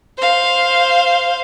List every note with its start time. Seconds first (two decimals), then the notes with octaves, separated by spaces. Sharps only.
0.17 C5 F5